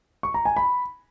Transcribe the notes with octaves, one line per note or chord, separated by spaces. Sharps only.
C#6
A#5
G#5
B5